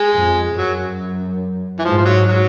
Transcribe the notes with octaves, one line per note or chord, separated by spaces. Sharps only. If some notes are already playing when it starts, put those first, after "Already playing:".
Already playing: G#3
F2
F#2 F#3
E3
G#2 F3
F3
F#3
F#3